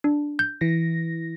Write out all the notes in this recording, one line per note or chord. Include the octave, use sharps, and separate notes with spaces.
D4
G6
E3 A#6